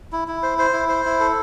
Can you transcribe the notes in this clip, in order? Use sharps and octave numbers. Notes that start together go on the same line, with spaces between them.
E4
E4
C5
C5
E4
C5
E4
A4